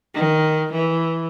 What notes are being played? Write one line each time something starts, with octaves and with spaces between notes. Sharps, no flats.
D#3
E3